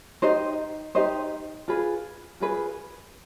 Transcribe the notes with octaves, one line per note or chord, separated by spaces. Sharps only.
D#4 G4 C5 D#5
D#4 G4 C5 D#5
F4 G#4 B4
F4 G#4 B4